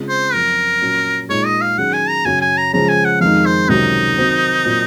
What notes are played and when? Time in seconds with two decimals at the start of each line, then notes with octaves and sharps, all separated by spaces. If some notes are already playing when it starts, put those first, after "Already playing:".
Already playing: C#3 G#3 C4 F4 G#4
0.09 C5
0.33 F#2 F3 C4 A#4
0.81 A#2 F#3 C#4 F#4
1.29 A#2 G#3 D#4 G#4 C#5
1.45 D#5
1.62 F5
1.78 D#3 F#3 C#4 G#4 F#5
1.94 G#5
2.09 A#5
2.25 F#2 C#3 F#3 C#4 F#4 G#5
2.41 G#5
2.57 A#5
2.73 C#3 F3 G#3 C#4 G#4 A#5
2.89 G#5
3.05 F#5
3.21 F2 D#3 G#3 D#4 F5
3.46 C5
3.69 C#2 C3 D#3 F#3 D#4
4.17 D#3 F#3 C4 F#4
4.65 A#2 F#3 C4